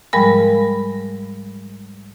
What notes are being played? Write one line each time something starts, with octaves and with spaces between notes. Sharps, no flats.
G#2 F3 G3 G#3 A#4 B5